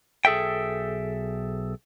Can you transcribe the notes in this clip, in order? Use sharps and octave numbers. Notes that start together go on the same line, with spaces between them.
B1 G#4 A4 E5 G5